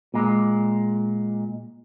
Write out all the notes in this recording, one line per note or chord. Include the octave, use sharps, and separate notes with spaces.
A#2 G#3